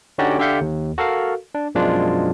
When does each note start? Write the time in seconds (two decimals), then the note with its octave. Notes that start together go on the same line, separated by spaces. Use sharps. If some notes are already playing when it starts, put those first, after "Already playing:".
0.18 D3 C#4 D#4 F#4 G4 D5
0.39 D3 G4 E5 F5 G6 C#7
0.61 D#2
0.98 F#4 A4 A#4 F5
1.55 D4
1.75 F#2 B2 F3 G#3 D4 F4